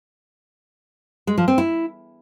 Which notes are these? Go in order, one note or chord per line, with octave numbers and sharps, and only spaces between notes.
G#3
F3
C4
E4